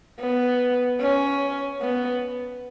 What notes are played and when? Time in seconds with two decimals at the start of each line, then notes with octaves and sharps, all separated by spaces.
0.20 B3
1.00 C#4
1.80 B3